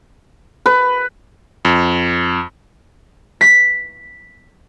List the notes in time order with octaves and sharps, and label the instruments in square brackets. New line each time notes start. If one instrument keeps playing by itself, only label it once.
[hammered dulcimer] B4
[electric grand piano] F2
[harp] B6